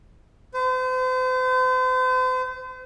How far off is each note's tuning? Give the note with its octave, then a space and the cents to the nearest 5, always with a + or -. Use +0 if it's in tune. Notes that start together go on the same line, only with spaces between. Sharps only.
C5 -40